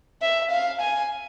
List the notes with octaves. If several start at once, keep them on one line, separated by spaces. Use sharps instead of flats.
E5
F5
G#5